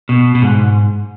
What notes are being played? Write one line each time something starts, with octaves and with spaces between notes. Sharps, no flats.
B2
B2
G#2